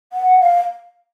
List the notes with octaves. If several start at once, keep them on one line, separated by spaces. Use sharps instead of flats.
F#5
F5